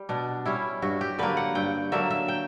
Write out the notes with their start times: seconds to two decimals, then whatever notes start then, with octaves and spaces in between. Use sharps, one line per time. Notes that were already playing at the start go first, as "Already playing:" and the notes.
Already playing: G3
0.09 B2 D4
0.46 G3 C#4 E4
0.82 G2 F#4
1.01 G4
1.19 D3 F#3 A#3 B4
1.37 F#5
1.55 G2 G5
1.92 D3 F#3 A#3 E5
2.11 E5
2.28 G5